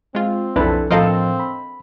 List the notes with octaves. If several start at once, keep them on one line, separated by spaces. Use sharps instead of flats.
G#3 C4 F4
B1 F2 D4 E4 A4 B4
A2 F3 C4 A4 A#4 C5 D#5 F5
B5